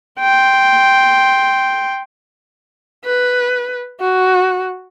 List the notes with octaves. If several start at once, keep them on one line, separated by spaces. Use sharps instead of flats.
G5 C6
B4
F#4